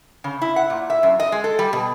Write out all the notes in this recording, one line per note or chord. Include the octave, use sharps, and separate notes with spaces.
C#3
E4
F#5
A#2
E5
F#2
D#5
G#3
A4
G3
B2